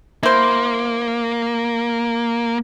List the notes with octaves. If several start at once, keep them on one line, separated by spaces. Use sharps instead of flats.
A#3 E4 C5